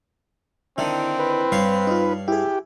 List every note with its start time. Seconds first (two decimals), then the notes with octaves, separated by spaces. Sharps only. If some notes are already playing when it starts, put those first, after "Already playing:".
0.78 D3 D#3 C4 E4
1.19 B4
1.52 G2 C#5 F5
1.87 D#4 F4
2.28 E4 G4 G#4